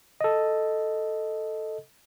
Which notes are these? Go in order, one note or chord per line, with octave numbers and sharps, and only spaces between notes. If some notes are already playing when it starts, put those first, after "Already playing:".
A4 D#5